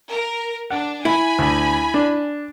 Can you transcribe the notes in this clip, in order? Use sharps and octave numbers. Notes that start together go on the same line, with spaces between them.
A#4
D4 F#5
E4 G#5 B5
D2
D4